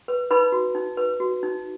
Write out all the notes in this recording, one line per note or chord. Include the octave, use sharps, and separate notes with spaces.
B4
D#4 B4 B5
F#4
D#4
B4
F#4
D#4